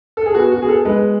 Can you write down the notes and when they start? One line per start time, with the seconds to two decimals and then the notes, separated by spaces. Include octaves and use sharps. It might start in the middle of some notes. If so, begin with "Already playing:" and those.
0.17 A4
0.26 G#4
0.34 B3 F#4
0.52 F#4
0.60 B3 G#4
0.69 A4
0.85 G#3 B4